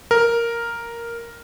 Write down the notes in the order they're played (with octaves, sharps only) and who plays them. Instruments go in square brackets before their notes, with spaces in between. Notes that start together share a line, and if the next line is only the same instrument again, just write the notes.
[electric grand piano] A#4